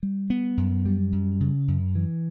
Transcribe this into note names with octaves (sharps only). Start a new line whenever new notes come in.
G3
B3
F#2
G3
F#2
C#3
F#2
E3